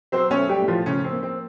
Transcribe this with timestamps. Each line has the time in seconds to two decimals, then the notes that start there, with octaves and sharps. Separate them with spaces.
0.12 F#3 C4 C5
0.31 C#4 C#5
0.37 A3
0.49 G3 G4
0.62 A2
0.68 F3 F4
0.86 C#3 F3 C#4
1.04 C4
1.11 A#3
1.23 C4